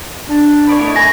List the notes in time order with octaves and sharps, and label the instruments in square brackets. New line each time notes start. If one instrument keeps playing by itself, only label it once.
[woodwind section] D4
[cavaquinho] C#5 D5 B5
[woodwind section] A3 [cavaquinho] E4 C#5 D#5
[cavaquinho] G#5 B5 [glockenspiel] A#6